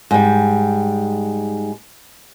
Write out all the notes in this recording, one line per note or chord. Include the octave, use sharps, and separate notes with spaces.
G#2 G3